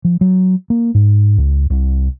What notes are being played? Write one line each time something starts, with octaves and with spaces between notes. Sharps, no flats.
F3
F#3
A#3
G#2
C#2
C2